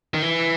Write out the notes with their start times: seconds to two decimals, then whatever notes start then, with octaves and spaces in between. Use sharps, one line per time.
0.14 D#3
0.22 E3